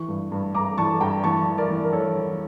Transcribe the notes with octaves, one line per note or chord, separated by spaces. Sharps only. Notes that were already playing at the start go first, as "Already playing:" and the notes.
Already playing: E3 C#6
G2
G2
G2 A#5 D6
E3 A5 C#6
G2 G5 A#5
E3 A5 C#6
E3
A#4 D5
E3
A#4
E3 A4 C#5
E2